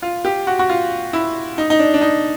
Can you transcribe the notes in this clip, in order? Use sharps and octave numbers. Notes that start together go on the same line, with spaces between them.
F4
G4
F#4
F#4
F4
E4
D#4
D#4
D4
D4
D#4